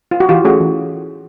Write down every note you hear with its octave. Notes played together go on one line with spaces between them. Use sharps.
F4
F#4
E3 F4 G4
A3 C#4 F#4 G#4
E3